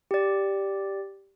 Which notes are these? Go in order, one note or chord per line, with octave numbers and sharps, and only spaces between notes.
G4 D5